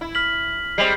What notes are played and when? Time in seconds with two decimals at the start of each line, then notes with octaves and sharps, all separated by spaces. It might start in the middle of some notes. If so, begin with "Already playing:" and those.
0.01 E4
0.15 F6 B6 F#7
0.78 G3 G#3 C4 C7